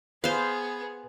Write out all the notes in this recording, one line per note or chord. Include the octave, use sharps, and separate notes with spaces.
B3 G#4 B4 C5 F5